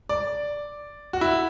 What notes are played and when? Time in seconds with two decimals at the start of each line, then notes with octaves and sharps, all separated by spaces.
0.09 D5
1.13 F#4
1.21 E4